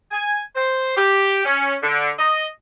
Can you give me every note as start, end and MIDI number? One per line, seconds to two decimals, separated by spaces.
0.11 0.39 80
0.56 0.96 72
0.97 1.40 67
1.44 1.75 61
1.82 2.09 50
2.19 2.46 75